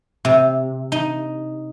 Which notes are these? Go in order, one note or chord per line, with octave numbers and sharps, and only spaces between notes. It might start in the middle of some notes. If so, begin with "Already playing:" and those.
C3
D#4